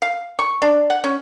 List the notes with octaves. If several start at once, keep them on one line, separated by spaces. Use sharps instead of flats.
F5
C#6
D4
F#5
C#4